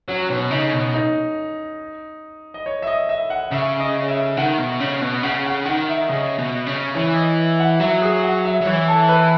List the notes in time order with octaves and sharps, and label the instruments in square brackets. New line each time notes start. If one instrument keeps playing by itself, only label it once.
[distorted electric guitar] F#3 [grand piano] C#4
[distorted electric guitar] B2 [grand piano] C#4
[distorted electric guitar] C#3 [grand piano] D#4
[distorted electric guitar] B2 [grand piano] C#4
[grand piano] D#4
D#5
C#5
E5
D#5
E5
F#5
[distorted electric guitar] C#3 [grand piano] E5
[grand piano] D#5
E5
[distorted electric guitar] D#3 [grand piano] F#5
[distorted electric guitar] B2
C#3
B2
[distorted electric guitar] C#3 [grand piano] F#5
[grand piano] F#5
[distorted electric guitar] D#3 [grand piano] F#5
[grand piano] E5
[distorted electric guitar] C#3 [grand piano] D#5
[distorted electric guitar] B2
C#3
[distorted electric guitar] E3 [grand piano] C#5
[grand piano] D#5
F#5
[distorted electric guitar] F#3 [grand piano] E5
[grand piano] G#4
F#5
E5
[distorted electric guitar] F#3
[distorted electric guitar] E3 [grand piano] C#5
[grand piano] A4
B4